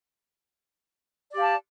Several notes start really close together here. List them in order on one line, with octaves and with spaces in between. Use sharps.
D5 G4 F5 A5